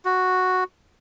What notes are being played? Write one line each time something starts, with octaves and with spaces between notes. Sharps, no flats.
F#4